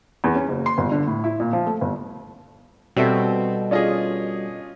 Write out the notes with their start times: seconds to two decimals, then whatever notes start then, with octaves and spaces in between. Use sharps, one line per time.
0.24 E2
0.35 C#4
0.48 F#1
0.66 C6
0.78 G1
0.92 D3
1.07 A2
1.24 E4
1.40 A#2
1.53 F3
1.66 A3
1.81 G1
2.97 B2 G3 C4 F#4 A4 C5 E5
3.71 C#4 D4 F4 G#4 D#5